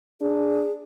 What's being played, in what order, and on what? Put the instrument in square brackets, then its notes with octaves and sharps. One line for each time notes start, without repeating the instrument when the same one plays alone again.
[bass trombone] D4 [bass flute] G#4